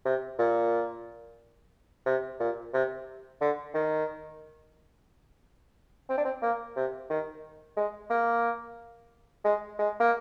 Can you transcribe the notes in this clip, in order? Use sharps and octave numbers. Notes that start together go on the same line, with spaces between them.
C3
A#2
C3
A#2
C3
D3
D#3
C4
D4
C4
A#3
C3
D#3
G#3
A#3
G#3
G#3
A#3